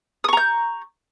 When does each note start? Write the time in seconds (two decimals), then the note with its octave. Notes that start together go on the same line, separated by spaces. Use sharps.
0.24 D#6
0.29 C#6
0.33 A#5
0.37 G6